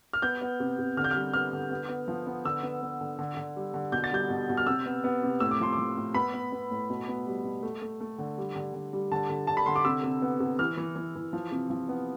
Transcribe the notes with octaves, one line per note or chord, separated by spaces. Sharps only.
F6
B3 G6
B3
C3
C3
D3 F6
G6
G3 F6
B3 F6
D3
B3
B3
F3
B3
D3 E6
B3
B3
D3
D3
D3
G3
D3
B2 G6
A6
G3 G6
B2
B2
F6
C3 E6
B3
B3
C3
A2 E6
D6
F3 C6
D6
F3
A2
B3 B5
B3
B3
A2
B2
B3
G3
B2
A3
A3
A3
D3
G3
D3
D3
G3
D3 A5
D3
D3 A5
B5
D3 C6
D6
C3 E6
C3
B3
C3
E3 F6
E3
E3
E3
F3
C3
F3
B3